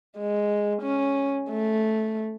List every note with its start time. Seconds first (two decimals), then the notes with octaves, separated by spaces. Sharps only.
0.18 G#3
0.82 C#4
1.50 A3